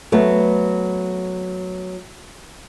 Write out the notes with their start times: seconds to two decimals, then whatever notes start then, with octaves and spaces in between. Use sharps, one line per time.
0.12 F#3 A3 B3